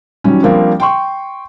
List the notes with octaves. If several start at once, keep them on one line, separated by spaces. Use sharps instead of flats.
D#3 F#3 G3 C#4
F3 G3 A#3 C4 D4
G5 C6 C#6